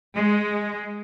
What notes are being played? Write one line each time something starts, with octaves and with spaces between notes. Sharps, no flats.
G#3